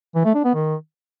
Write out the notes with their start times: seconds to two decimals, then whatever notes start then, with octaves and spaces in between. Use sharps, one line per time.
0.15 E3
0.25 A3
0.35 D4
0.45 B3
0.55 D#3